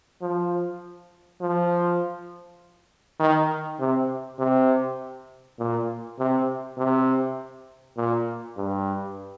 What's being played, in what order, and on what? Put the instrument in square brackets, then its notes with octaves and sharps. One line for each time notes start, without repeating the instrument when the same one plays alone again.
[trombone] F3
F3
D#3
C3
C3
A#2
C3
C3
A#2
G2